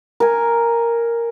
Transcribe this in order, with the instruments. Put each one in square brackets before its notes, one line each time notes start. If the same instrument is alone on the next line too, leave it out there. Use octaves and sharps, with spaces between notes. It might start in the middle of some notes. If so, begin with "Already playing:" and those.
[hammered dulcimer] A#4 G#5